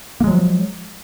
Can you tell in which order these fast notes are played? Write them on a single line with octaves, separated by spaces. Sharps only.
A#3 G#3 F#3 F3